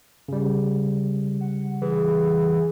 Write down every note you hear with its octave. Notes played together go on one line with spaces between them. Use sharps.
C#3 G3
F#5
E3 G#4